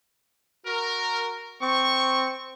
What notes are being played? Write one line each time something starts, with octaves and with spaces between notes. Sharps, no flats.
F#4 A#4
C4 C#6